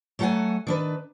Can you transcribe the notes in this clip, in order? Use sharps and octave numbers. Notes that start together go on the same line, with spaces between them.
F#3 A3 A4 C5 F#5 G#5
D#3 D4 B4